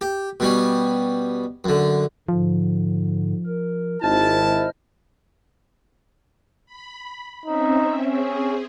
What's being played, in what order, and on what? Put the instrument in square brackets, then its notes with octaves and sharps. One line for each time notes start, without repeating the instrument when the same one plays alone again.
[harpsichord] G4
B2 G3 C#4
F#2 D3
[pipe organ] G#2 D3 [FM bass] F3
[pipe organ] A#4
[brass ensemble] G#1 E4 A5 [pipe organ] C5 D#5 F6
[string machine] B5
[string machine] C4 C#4 E5 [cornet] D#4
[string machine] C4 G#4 [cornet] C#4